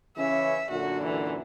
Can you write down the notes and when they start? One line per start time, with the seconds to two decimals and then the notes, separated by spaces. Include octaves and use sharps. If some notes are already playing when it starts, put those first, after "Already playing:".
0.17 C#3 E3 C#4 E5
0.71 F#2 A#2 D3 F#4
1.04 E3